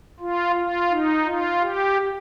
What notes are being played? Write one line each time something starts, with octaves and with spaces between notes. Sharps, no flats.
F4
F4
D#4
F4
G4